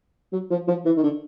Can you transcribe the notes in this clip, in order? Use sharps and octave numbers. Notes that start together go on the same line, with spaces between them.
F#3
F3
F3
E3
D#3
D3